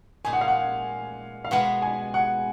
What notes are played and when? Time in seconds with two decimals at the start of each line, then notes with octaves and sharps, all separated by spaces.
0.25 A#2 G#3 D#4 G#5
0.33 F#5
0.41 F5
0.48 F#5
1.45 F5
1.51 B2 G#3 B3 F#5
1.82 G#5
2.14 F#5